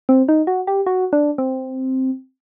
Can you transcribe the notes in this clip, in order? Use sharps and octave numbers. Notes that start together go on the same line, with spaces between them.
C4
D#4
F#4
G4
F#4
D4
C4